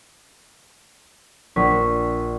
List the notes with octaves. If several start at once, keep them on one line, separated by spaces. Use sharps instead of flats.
A#1 D4 C#6 B6